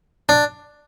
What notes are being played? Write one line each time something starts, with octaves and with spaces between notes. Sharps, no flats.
D4